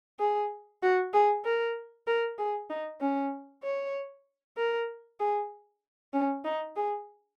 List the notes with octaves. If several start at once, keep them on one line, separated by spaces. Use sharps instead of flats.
G#4
F#4
G#4
A#4
A#4
G#4
D#4
C#4
C#5
A#4
G#4
C#4
D#4
G#4